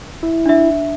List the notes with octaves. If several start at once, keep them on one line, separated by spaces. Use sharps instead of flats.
E4
D4 E5